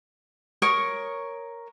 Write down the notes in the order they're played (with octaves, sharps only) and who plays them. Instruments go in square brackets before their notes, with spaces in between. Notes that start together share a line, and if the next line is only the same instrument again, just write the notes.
[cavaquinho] A#4 C#5 C#6 D#6